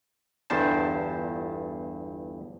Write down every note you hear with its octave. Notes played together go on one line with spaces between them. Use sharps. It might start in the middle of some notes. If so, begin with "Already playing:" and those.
G1 E2 G2 C5 A5